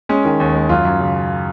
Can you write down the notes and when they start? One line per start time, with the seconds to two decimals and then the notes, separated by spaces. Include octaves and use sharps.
0.09 G#3 C#4
0.25 D#3
0.40 D#2
0.54 G#3
0.69 F#2 F4
0.85 F#2
1.00 C#3